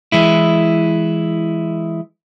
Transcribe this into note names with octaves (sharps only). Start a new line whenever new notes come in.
E3 G#3 E4